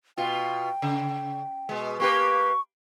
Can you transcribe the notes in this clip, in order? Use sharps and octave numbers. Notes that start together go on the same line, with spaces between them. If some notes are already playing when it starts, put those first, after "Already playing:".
B2 F4 G5
C#3
B2 G#3
A#3 G4 B4 C#6